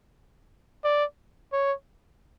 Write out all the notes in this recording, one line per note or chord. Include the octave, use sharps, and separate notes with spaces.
D5
C#5